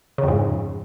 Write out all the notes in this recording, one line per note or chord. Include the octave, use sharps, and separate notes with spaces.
F2 G#2 C#3